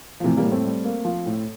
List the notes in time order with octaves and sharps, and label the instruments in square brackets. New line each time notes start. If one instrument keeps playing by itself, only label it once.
[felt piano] F3
[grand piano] A2 [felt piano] C3 E3
[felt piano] G3 A#3
[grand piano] A2
[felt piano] A3 C4
[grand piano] G3
A#3
F3
A2